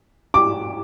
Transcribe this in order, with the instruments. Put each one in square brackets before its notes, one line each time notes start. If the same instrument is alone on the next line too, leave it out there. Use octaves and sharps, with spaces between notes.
[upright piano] D6